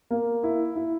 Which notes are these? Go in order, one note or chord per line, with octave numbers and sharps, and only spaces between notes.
A#3
E4
E4